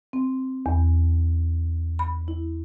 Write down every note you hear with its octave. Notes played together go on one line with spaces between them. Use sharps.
C4
E2
B5
E4